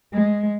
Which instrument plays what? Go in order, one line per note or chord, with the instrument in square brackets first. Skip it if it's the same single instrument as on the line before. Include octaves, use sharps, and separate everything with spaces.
[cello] G#3